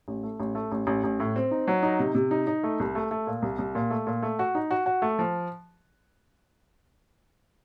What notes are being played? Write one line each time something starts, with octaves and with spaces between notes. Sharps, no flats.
A1
A3
A1
A3
A1
A1
A1
A2
C4
D#4
F#3
D#4
C3
C3
D#4
D#4
A3
C2
A3
A3
A#2
C2
C2
A#2
A3
A#2
A3
F#4
D#4
F#4
F#4
A3
F3